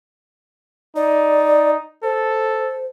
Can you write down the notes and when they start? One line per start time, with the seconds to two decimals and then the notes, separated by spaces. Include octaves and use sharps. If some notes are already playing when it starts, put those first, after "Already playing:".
0.96 D#4 D5
2.03 A4 C5